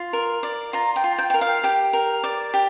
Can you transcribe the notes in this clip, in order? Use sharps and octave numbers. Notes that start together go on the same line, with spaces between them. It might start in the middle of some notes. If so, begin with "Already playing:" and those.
Already playing: F4 C6
A#4
D5
F4 A#5
G5
F4
G5
A#4 G5
F5
G4 G5
A#4
D5
G4